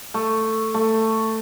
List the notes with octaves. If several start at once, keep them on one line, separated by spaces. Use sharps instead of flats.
A3
A3